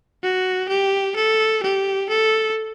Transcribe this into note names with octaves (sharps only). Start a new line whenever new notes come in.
F#4
G4
A4
G4
A4